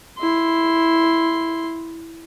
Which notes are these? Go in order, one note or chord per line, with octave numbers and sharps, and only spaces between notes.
E4 C6